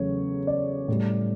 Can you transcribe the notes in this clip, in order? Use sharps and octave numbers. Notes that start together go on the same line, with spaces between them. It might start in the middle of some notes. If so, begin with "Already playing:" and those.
Already playing: E2 C#3 F#3 A3 C#5
D5
A2 G3